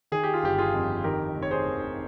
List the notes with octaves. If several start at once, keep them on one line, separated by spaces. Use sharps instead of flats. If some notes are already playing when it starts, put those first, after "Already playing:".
D#3 G#4
G4
F4
G1 G4
F4 G#4
F2
D#3 G4 A#4
F1
C#5
G#4 C5
D#2